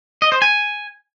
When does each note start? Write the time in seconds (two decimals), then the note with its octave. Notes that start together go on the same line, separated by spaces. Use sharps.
0.22 D#5
0.32 C5
0.42 G#5